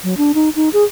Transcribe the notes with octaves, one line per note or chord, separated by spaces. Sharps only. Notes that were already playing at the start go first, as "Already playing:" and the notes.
F#3
D4
D#4
D#4
G#4